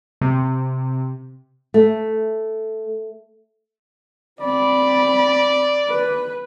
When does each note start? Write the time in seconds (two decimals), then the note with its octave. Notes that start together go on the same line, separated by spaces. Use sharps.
0.21 C3
1.74 A3
4.40 C4 D5 B5
5.88 B4